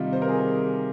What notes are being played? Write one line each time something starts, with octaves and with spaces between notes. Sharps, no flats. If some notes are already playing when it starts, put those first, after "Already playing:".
Already playing: C3 D#3 G3 D#4 F4 G4
C5
A#4
G#4